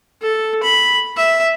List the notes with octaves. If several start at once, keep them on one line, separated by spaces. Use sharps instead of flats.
A4
B5
E5